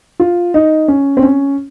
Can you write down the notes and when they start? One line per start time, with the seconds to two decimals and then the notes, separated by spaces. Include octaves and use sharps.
0.20 F4
0.54 D#4
0.88 C#4
1.17 C4
1.23 C#4